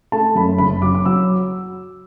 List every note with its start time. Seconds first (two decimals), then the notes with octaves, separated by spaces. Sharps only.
0.12 A3 A5
0.36 F#2 B5
0.58 F#1 B5
0.82 F#3 D6
0.95 D6
1.06 F#3 E6